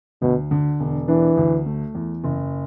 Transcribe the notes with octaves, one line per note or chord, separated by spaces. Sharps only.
D2 B2
D3
E1
E3 D4
D2
A3
E2
F#1